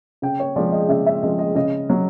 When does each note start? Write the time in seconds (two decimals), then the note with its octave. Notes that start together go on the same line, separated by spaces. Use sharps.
0.22 C#3 G5
0.40 C#5
0.56 F3 G#3 D5
0.72 D#5
0.89 C#3 E5
1.06 E5
1.23 F3 G#3 D#5
1.39 D#5
1.55 C#3 D#5
1.90 F#3